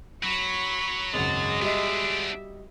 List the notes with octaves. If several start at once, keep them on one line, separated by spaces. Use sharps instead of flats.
F#3 B5 C#6
G#1 C#2 F#2 G#3 A6
G3 B3 D4 F#4 D#5 E5